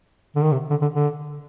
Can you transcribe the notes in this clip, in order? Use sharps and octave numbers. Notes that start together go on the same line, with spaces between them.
D3
D#3
C3
D3
D3
D3